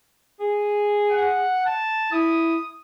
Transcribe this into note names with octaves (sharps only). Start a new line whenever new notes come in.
G#4
F#5
A5
E4 D#6